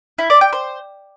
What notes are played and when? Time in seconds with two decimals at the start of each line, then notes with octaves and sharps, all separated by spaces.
0.18 E4
0.30 D5
0.41 G5
0.53 C5